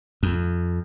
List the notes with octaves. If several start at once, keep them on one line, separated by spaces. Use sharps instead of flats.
F2